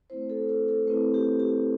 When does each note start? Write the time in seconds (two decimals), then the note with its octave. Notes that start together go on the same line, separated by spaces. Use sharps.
0.10 A3 C4 E4 C5
0.30 A4
0.49 A4
0.68 A4
0.87 A3 C4 E4 B4
1.14 G4
1.39 G4